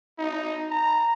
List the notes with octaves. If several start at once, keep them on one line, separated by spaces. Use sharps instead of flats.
D#4
A#5